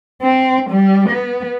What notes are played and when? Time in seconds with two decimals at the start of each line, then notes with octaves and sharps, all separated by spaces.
0.22 C4
0.70 G3
1.09 B3